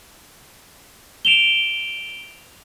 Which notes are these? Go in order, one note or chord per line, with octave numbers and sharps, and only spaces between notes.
D7 E7 F7 G7